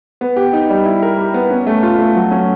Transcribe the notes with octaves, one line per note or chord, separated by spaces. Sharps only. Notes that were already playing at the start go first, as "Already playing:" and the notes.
B3
G4
D#4
G3
E4
A#4
G4
B3
C#4
A3
F4
A3
F#3
C#4